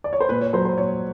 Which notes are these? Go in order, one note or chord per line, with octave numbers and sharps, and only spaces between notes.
D5
C#5
C5
A#2 B4
C#5
F#3 C5
C5
A#2 C#5